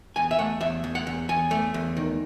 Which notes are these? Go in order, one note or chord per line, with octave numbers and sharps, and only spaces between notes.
E2 G#5
E5
A3 F#5
E2 E5
E2
F#5
E2
E2 G#5
A3
E2
D#3